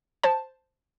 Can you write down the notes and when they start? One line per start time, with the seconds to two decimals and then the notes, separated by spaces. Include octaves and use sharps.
0.23 C5 A5